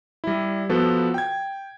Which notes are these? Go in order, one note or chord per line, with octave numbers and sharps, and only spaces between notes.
G3 E4
F3 B3 F#4 A4 B4
G5 G#6